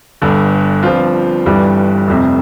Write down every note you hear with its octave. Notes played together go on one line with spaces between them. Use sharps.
G1 G2 D3
G2 F3 C4 F4
G1 G2 E3 G3
F1 F2 C3